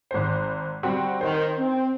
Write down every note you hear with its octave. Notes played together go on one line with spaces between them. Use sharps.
G#1 C5
G3 C4 F#4
D#3 C5
C4